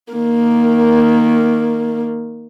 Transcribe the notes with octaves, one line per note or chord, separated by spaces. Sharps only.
D#3 A#3